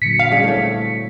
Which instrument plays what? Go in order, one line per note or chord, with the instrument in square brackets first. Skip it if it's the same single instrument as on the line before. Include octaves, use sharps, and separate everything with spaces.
[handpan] A#2 D3 F#3 [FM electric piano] B6 C#7
[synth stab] F5
[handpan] G3 [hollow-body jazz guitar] C#4 G#4 D5
[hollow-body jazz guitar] A3 C#5 [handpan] C4 E4 A4